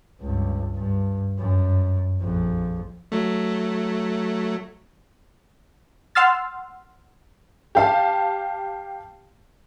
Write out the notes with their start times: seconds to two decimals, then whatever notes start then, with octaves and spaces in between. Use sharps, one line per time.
0.20 C#2 G2
0.76 G2
1.38 F#2
2.21 A#1 F2
3.12 F#3 A3
6.15 F#5 C6 E6 F6 A6
7.75 G4 F5 A5